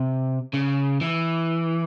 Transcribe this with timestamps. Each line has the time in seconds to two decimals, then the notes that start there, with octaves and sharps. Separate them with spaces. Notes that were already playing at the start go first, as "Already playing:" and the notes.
Already playing: C3
0.53 C#3
1.01 E3